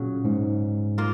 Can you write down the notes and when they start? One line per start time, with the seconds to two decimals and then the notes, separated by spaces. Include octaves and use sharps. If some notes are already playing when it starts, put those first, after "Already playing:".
Already playing: A#2 C#3 F#3 C#4
0.25 G#2
0.98 A#3 F4